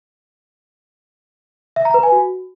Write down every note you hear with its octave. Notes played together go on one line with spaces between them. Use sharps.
E5
A#5
B4
G#5
F#4